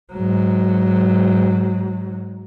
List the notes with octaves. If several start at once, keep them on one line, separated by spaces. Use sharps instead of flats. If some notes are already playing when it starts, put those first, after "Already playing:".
G#2 F#3